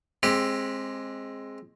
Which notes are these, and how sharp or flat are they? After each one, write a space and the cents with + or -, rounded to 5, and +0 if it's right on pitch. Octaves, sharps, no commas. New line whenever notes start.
G#3 +0 C4 +20 G4 +0